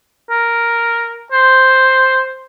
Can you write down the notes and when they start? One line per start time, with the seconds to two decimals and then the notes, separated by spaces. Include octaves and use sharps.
0.30 A#4
1.32 C5